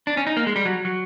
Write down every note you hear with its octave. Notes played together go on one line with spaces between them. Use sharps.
D4
C#4
D#4
A#3
G#3
G3
F#3
F#3